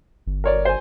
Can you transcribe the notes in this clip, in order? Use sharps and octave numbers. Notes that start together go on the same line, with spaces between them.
G1
A#4 C#5 D5
C5 G#5